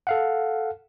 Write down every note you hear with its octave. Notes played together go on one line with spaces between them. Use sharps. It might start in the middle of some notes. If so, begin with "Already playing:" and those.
A4 F5 F#5